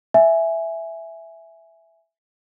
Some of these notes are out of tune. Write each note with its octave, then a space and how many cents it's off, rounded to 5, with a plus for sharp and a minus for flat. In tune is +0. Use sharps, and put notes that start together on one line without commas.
E5 +0 G#5 +0